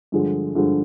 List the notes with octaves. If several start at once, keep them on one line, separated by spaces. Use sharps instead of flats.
G2 D3 F3 G#3
G2 D3 F3 G#3